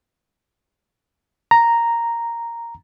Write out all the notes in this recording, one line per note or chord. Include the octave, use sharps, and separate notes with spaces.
A#5